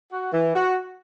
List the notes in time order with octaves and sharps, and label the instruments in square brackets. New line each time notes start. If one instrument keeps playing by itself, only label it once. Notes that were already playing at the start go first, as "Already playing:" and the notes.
[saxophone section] F#4
E3
F#4